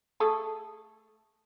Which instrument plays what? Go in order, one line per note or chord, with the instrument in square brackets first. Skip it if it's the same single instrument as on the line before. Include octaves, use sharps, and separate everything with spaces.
[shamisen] A3 G#4 A4